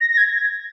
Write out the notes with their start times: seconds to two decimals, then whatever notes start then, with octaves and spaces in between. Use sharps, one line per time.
0.01 A#6
0.11 A#6
0.17 G#6